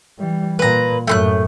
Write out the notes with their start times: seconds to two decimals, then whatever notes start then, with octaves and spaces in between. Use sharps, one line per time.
0.20 E3 G3
0.59 A#2 B4 A#5
1.07 F#2 A2 A3 C6 F#6